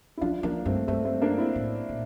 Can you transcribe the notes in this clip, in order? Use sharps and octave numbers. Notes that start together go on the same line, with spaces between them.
E4
F3 D4 F4
F3 A#3 D4
G2 A3 C4
G2 A3 C4
A3 C4
A#3 D4
C4 E4
A2
A#2